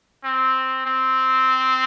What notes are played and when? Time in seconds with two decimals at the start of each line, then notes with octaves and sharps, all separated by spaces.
0.24 C4
0.86 C4